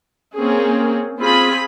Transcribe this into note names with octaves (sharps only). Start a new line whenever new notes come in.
A#3 C4 C#4 G#4
C4 F4 G#4 B5